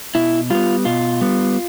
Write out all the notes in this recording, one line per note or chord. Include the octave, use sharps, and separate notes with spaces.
B2 E4
G3 B3 F4
B2 F4
G3 B3